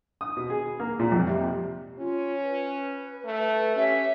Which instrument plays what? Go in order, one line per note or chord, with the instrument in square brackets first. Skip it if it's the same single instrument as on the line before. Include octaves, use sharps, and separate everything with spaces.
[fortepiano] D#6
B2
G#4
A#3
A#2
F2
C3
[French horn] C#4 [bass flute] F4
[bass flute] B4
[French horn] A3
[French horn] C#4 [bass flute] G4 [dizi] E5